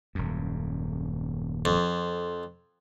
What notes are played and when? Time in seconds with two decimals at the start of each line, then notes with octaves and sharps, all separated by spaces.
0.15 D#1 F#2
1.65 F2